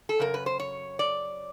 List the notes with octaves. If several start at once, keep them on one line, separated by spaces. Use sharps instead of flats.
A4
F#2 C#3 A#4
B4
C5
C#5
D5